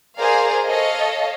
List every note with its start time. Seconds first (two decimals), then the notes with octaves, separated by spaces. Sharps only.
0.19 G#4 A#4 C5 D5 F5
0.66 A4 C#5 D#5 F5